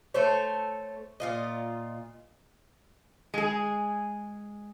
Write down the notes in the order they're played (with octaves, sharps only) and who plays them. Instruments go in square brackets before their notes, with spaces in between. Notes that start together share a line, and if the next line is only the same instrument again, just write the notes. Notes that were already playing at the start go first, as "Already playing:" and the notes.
[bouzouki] A3 A4 C5 C#5
A#2 F4 D#5
[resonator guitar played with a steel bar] G#3 G#4